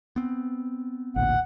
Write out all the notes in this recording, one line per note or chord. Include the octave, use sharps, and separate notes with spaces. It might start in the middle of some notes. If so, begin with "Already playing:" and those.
B3 C4
A1 D2 A#2 F#5